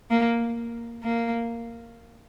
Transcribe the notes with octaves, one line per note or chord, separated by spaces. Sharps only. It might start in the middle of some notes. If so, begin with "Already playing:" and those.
A#3
A#3